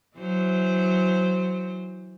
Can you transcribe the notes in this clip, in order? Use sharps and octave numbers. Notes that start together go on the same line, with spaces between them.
E3 F#3 C5